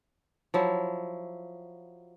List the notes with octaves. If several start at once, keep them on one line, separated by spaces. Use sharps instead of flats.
F3 F#3 E4